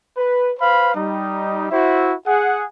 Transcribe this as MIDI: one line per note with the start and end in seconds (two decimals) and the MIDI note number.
0.16 0.52 71
0.59 0.92 71
0.59 0.92 72
0.59 0.92 77
0.59 0.92 83
0.94 1.66 55
0.94 1.66 63
1.71 2.12 64
1.71 2.12 66
1.71 2.12 72
1.71 2.12 76
2.26 2.64 68
2.26 2.64 78